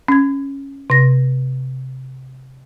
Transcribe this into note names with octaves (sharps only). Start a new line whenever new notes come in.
C#4 G#6
C3 A#6